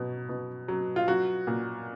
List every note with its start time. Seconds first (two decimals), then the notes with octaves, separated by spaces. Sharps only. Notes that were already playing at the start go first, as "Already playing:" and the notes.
Already playing: B2 F#3
0.29 B2
0.68 F#3
0.96 F4
1.08 F#3 F#4
1.47 A#2